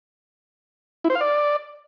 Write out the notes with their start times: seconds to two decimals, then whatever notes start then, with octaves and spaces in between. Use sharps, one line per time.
1.04 E4
1.10 C5
1.15 F5
1.21 D5